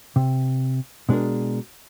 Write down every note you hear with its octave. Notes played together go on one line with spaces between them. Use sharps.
C3
B2 G#3 D4 G#4 A#4